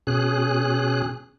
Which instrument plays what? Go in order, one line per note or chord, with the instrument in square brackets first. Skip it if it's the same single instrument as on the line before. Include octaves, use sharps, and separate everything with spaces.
[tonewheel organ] B2 C#4 G#4 F#6